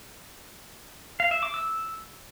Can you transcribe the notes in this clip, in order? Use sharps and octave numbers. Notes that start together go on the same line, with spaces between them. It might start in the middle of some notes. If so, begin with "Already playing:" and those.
F5
E5
D6
E6